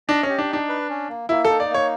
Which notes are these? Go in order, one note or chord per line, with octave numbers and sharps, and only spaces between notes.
D4 D#5
C#4
G4
D4
D4 D#4
B4
C#4
A#3
A#3 E4
D#4 A4
D5
A#3 C#5